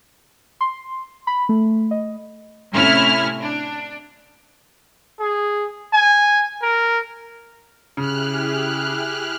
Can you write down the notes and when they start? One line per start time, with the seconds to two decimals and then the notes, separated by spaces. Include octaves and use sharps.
0.61 C6
1.27 B5
1.49 A3
1.91 D#5
2.73 A2 C3 C#4 E4 F6
3.40 D4
5.20 G#4
5.93 G#5
6.62 A#4
7.97 C#3 E4 G4 G#4 F6 F#6